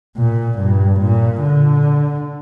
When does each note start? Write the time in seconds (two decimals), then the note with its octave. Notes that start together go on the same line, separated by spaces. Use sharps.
0.17 A#2
0.59 G2
1.01 A#2
1.42 D3